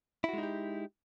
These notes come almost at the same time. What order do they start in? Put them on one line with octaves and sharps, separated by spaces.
E4 F#4 G#3 D#4 G4